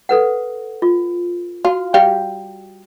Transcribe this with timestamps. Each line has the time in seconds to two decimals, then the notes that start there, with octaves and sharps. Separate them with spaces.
0.09 A4 B4 F#5
0.82 F4
1.65 F4 F#4
1.94 G3 G4 F5